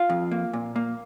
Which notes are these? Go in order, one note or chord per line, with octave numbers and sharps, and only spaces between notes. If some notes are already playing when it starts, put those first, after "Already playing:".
Already playing: F4 F5
F2
A#3
A#2
A#3